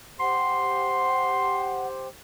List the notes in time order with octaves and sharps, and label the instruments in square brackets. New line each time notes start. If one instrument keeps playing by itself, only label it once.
[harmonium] G4 C5 [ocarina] F#5 [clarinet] C6